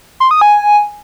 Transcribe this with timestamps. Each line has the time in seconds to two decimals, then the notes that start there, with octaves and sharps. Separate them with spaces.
0.20 C6
0.31 D#6
0.41 G#5